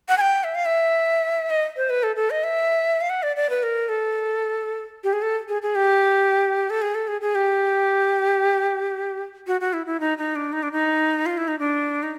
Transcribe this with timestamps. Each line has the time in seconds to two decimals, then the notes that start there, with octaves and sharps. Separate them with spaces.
0.09 F#5
0.18 G#5
0.21 G5
0.44 E5
0.55 F5
0.65 E5
1.50 D#5
1.77 C5
1.90 B4
2.03 A4
2.16 A4
2.30 D#5
2.44 E5
3.01 F5
3.10 F#5
3.23 D5
3.36 D5
3.50 B4
3.63 A#4
3.89 A4
5.04 G4
5.13 G#4
5.22 A4
5.48 G#4
5.62 G#4
5.75 G4
6.70 A4
6.82 G#4
6.95 A4
7.08 G#4
7.21 G#4
7.35 G4
9.47 F#4
9.61 F#4
9.73 E4
9.86 E4
10.00 D#4
10.18 D#4
10.36 D4
10.53 D#4
10.63 D4
10.72 D#4
11.26 F4
11.38 E4
11.48 D#4
11.59 D4
12.03 D#4